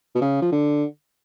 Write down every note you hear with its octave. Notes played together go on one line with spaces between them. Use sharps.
B2
C#3
F3
D3